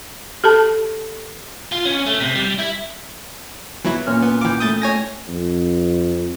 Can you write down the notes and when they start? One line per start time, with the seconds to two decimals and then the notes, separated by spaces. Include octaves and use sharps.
0.44 G4 A4 A5
1.72 F4
1.85 C#4
2.07 A3
2.21 C3
2.35 G3
2.59 E4
3.85 E3 F#3 B3 E4
4.06 A#2 C#4 F6
4.23 B3
4.41 E3 F5 G5 D6
4.60 A3 E4 D#6 G6 A6
4.82 C#5 G#5 A#6
5.29 F2